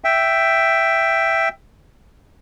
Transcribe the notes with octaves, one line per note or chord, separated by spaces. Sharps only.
E5 G5